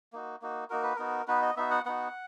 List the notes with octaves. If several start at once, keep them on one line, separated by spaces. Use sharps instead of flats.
A#3 D#4 F#4
A#3 D#4 F#4
A#3 D#4 F#4 A#4
B4
B3 D#4 F#4 A#4
B3 D#4 F#4 B4
D#5
B3 D#4 F#4 E5
F#5
B3 D#4 F#4 F#5